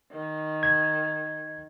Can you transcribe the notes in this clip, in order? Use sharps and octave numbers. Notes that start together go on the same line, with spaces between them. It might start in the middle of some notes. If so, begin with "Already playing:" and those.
D#3
G#6